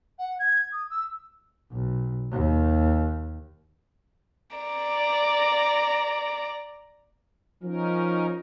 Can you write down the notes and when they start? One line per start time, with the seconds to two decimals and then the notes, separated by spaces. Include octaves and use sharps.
0.18 F#5
0.39 G#6
0.72 D#6
0.90 E6
1.71 B1
2.32 D#2
4.57 D5 A#5
7.63 F3 C#4 D#4 A#4